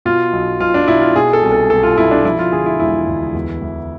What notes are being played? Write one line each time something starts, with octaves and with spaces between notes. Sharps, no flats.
B2 F4
B1
B1 F4
D4
B2 E4
F4
B2 G#4
A4
C2
A4
C2 A4
F4
B2 E4
D4
F3 E4
F4
D3 G#4
E4
E1 E4
D2
E2
E3